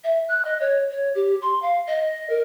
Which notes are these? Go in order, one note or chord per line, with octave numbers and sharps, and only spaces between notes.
E5
F#6
D#5
C#5
C#5
G4
C6
F5
D#5
A#4